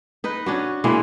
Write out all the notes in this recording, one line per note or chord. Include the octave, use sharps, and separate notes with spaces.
D#4 B4
C#4 D4 F#4
B2 E3 G#3 A#3